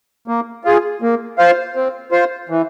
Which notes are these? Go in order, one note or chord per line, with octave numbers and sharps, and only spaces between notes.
A#3
F4 G#4
A#3
F4 C5 F5
C4
F4 C5
E3